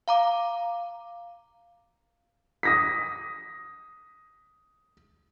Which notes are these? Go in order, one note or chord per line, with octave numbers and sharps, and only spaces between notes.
F5 A#5 D6
D#6 A#6 B6